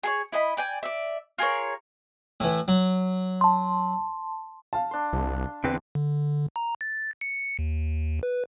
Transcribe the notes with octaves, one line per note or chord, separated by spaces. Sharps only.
G#4 A4 C#5
E4 D#5 B5
D5 G5 G#5
D5 E5
F4 G#4 A#4 C#5
A2 E3
F#3
A5 C6
F5 A5
D4 C6
C2
E2 D3 C4 B4
D3
A#5
A6
C#7
D#2
B4